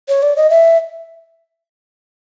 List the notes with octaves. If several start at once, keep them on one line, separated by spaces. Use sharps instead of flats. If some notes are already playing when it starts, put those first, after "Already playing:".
C#5
D5
D#5
E5